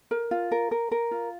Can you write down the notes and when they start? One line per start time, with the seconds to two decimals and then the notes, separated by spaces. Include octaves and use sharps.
0.11 A#4
0.31 F4
0.51 A#4
0.71 A#4
0.91 A#4
1.11 F4